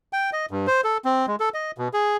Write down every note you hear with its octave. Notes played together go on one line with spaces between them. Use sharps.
G5
D#5
G2
C5
A4
C4
G#3
A4
D#5
B2
G#4